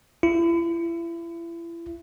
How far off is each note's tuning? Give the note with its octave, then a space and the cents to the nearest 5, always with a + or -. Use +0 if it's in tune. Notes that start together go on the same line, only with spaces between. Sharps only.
E4 +35